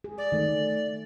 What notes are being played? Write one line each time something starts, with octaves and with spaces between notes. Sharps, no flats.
G#4
D5
D#3 A3